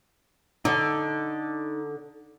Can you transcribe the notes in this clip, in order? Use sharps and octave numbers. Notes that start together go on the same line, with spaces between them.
D3 D#4 A5